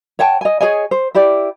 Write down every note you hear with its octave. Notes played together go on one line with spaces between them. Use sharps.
C#5 F#5 G5 A5
D#5 G#5
G#4 C#5 D#5 G#5
C5
E4 G4 D5